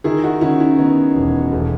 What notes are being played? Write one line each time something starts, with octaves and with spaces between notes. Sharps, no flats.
D#3 E4 G#4
D#4 F#4
D#3 C#4 E4
C#4 E4
D#3 B3 D#4
E1
E1 A3